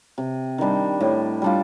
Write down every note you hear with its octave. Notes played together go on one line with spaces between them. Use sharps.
C3
D#3 G3 D4
A2
G3 D4 F4